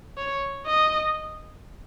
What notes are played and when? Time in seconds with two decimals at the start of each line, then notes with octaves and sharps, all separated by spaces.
0.18 C#5
0.66 D#5